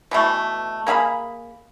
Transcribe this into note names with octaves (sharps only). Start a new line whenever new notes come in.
B2 E3 A3
A#3 G#4 F5 B5